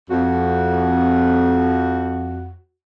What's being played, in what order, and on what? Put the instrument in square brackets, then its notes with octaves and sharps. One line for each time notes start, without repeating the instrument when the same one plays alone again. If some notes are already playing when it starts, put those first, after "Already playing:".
[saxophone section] F2 F#4